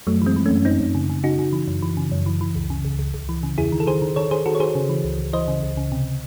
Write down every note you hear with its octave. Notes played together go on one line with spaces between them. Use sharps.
F#2 F#3 A3
E3 G#3 C4
E3
F#2 A3 C#4
F#2 C4 D#4
F#2
C#3
C#3
C#3 D#4 F#4
C#3
E3
F#2
E3
C#3
F#2
E3
E3
C#2
C#3
C#2
C#2
C#2
E3
C#3
E2 E4 G#4
D#3
A4
D#3 G#4 C5
D#3
D#3 A4 C#5
D#3 G#4 C5
D#3 F#4 A4
C#5
D#3 G#4 C5
C#3
E3
C#2
C#2
E3 C5 D#5
C#3
C#2
C#3
C3